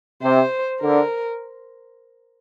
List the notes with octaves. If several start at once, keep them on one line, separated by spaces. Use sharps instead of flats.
C3 C5
D3 A#4